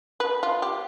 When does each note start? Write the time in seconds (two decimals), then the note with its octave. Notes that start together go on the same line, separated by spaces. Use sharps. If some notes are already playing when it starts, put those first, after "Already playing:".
0.20 B4
0.43 F4
0.62 G4